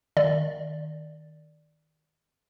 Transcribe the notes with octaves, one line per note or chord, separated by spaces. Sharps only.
D#3 D5